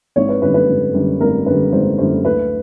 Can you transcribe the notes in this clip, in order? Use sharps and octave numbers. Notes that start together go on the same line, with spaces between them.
G#1 C#5
B4
F#2 D3 G3 B4
B4
G#1
F#2 D3 G3
G#1 A#4
F#2 D3 G3 B4
G#1 C5
F#2 D3 G3 C5
D2 B4